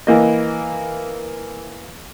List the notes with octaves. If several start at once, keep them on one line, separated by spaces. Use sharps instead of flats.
E3 A#3 D#5